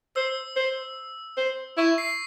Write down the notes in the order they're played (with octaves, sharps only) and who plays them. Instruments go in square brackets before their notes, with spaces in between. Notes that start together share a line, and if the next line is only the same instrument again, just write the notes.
[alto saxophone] C5 [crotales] E6
[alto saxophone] C5
C5
[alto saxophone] E4 [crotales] C#6
[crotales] C7